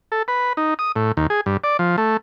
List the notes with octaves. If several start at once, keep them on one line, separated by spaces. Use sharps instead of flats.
A4
B4
D#4
D#6
A2
D#2
G#4
G2
D5
F3
A3